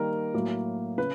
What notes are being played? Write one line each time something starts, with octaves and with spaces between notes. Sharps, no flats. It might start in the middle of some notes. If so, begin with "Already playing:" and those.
Already playing: D#3 G3 A#3 A#4
A2 F#3 A#3
C#3 B4